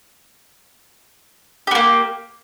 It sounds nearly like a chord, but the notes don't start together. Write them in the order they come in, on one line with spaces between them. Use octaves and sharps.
G4 B3 A#3